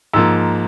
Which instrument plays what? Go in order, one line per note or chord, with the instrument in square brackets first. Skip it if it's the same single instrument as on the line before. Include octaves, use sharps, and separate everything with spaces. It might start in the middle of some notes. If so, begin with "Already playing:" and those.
[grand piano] G#2 F3 A#3 E6